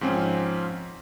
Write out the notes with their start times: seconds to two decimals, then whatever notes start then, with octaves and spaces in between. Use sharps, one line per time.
0.01 G#2 F3 C4 C#4 F4